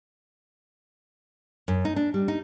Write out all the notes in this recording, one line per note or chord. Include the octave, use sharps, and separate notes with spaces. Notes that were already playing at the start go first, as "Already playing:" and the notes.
F#2
D#4
D4
G3
D#4